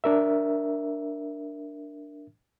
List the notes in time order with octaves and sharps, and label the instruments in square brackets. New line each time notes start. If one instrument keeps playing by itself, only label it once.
[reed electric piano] D4 A#4 E5